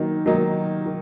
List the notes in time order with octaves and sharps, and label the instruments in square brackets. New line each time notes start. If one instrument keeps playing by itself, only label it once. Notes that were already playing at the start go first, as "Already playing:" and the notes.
Already playing: [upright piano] D#3 F#3 A#3 D#4
D#3 F#3 A#3 D#4
D#3